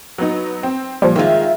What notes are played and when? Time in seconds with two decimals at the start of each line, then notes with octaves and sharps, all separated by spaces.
0.18 F#3 B3 D#4
0.63 C4
1.02 A#2 F3 G3
1.16 D#3 G#3 F4 E5